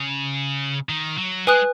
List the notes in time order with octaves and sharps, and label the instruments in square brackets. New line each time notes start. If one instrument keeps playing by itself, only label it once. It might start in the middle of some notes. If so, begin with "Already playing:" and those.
Already playing: [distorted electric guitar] C#3
D#3
F#3
[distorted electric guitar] G#3 [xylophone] B4 G#5 D#6 F#6